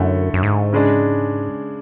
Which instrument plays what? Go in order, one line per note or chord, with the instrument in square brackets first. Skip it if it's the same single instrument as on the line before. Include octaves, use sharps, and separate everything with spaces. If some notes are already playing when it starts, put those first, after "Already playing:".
Already playing: [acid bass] F#2 [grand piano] D3 A3 E4
[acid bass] F#2
G#2
[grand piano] C#3 G#3 D4